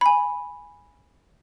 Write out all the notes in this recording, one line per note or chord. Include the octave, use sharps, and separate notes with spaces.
G#5 B5